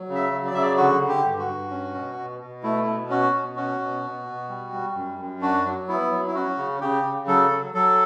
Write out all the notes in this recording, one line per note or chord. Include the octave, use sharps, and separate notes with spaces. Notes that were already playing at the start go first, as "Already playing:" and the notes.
Already playing: F#3
C#3
E5
F#3
D5
C#3 E5
D5
D3 F#4
D3
G4
G2
F#4
G2
C#4
B2
B2
B2
A3 E4
B2
C#4 F#4
B2
C#4 F#4
B2
B2
B2
G3
G3
F#2
F#2
D4 F#4
F#3
B3 E4
F#3
E4
C#4 F#4
C#3
C#3 G4
C#3
F#3 A4
F#3
F#3 A4